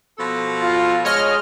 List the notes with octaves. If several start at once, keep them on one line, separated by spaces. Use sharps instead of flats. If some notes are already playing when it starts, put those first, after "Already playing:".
B2 F3 A4
F4
G#3 C#5 D#5 F6